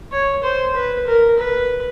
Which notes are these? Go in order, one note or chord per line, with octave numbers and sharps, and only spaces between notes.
C#5
C5
B4
A#4
B4